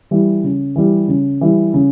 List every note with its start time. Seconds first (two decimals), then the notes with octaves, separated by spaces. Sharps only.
0.11 E3 G3
0.44 C#3
0.76 E3 G3
1.08 C#3
1.41 E3 G3
1.74 C#3